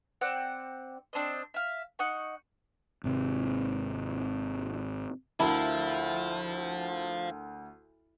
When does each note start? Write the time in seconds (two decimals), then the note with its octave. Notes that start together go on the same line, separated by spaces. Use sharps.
0.21 C4 D5 F#5 G5
1.13 C4 D4 C5 D#5
1.54 E5 F5
1.99 D#4 F#5 C#6
3.04 G#1 C3
5.40 D2 F3 E4 A#4 A5